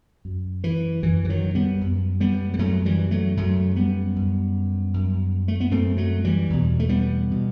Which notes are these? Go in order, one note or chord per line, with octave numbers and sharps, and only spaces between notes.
F#2
E3
F#2 E3
E3
D#3 F#3
G3 B3
F#2
G3 B3
G3
F#2 F#3 A3
E3 G3
F#3 A3
F#2 F#3 A3
G3 B3
F#2
F#2
A3
B3
F#2 A3 C4
F#3 A3
E3 G3
E2 B2
A3
G3 B3
B2